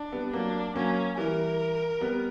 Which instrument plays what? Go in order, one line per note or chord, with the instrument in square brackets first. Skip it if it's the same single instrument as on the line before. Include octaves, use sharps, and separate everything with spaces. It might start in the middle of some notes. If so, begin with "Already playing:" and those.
Already playing: [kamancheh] D4
[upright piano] G3 B3
[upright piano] F#3 A#3 [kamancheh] D4
[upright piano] F#3 A#3 [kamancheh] C#4
[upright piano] E3 G3 [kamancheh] A#4
[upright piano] G3 B3